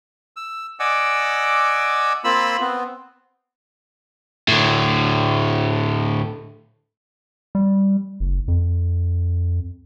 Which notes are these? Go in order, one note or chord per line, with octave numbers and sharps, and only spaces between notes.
E6
D5 D#5 F#5 G#5 D6 E6
A#3 C4 F4 B5 E6
B3 C4
A2 D3
G3
F#1
F2